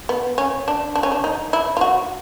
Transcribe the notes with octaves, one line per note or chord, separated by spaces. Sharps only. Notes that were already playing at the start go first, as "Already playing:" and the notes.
B3
C#4
D4
D4
C#4
D4
D#4
E4
F4
F#4